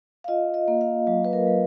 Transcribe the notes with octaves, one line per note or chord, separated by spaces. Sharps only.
F5
F4 D#5
D#5
A#3
F5
F#3
B4
A#4
F#3